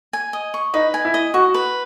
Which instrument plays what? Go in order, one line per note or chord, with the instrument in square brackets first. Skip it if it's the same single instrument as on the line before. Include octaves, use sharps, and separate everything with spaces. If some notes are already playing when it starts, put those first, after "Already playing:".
[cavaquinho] G#5
D#5
C#6
[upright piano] D#4 [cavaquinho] B4
[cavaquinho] G#5
[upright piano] E4
[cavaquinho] D#5
[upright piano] F#4 [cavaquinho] C#6
[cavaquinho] B4